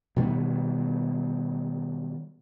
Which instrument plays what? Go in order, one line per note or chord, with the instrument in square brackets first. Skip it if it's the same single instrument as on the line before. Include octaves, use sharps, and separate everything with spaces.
[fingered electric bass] B2 D#3 G3 B3